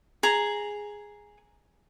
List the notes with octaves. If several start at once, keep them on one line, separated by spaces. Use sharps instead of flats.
G#4 A#5